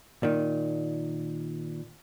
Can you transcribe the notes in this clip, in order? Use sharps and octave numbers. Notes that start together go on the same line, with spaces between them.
A#2 D#3